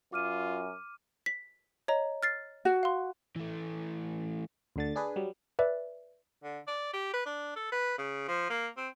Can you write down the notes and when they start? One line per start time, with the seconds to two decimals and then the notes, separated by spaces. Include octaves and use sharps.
0.13 F#2 F4 D6 F6 D#7
1.26 B6
1.88 C#5 D#5 A#5
2.23 F6 A6 C7
2.65 F#4
2.83 F5 C6
3.36 E3 A3
4.76 D2 D3 A6
4.96 D4 G#4 B4
5.16 F#3 G3
5.59 B4 D5 E5
6.44 D3
6.67 D5
6.93 G4
7.13 B4
7.26 D4
7.56 A4
7.72 B4
7.98 C#3
8.28 F3
8.50 A#3
8.77 C4